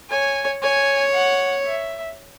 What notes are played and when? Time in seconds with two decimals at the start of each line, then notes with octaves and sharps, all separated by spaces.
0.10 C#5 G#5
0.62 C#5 G#5
1.14 F#5
1.66 E5